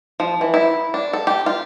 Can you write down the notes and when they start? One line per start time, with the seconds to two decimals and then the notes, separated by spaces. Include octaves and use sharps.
0.20 F3
0.41 E3
0.54 E4
0.94 D4
1.13 A4
1.27 G4
1.46 F4